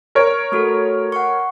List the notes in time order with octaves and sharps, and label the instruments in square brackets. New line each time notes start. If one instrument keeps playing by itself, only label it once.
[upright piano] A#4 C#5
[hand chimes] A3 F#4 A4
F#5 C#6